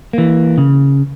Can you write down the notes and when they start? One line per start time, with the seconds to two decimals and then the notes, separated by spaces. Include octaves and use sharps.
0.13 E3 A#3
0.58 C#3